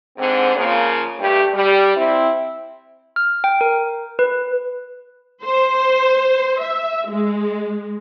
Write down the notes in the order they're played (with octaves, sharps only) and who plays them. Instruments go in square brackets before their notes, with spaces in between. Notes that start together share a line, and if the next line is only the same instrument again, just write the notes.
[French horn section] G#2 D3 C4
C#3 F3 A#3
G2 A3 G4
G3
C4 E4
[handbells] F6
G5
A#4
B4
[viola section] C5
E5
G#3